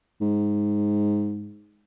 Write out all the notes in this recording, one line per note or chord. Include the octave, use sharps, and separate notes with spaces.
G#2